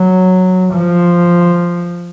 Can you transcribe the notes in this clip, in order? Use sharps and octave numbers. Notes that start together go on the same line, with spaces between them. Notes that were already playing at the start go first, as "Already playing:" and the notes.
Already playing: F#3
F3